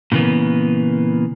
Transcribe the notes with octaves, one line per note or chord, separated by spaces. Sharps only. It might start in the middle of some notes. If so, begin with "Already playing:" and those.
A#2 C#3 E3 A#3 B3